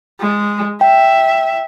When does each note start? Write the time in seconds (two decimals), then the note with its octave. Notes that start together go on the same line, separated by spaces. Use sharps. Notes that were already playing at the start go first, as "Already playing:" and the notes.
0.20 G#3
0.81 E5 G5